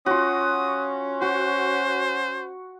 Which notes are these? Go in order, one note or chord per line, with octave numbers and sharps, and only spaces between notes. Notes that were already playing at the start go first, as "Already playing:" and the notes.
C#4 F4 F#4 D#6
F#4 C5